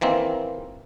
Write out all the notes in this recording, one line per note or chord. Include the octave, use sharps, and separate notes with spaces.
D#3 E3 A#3 C4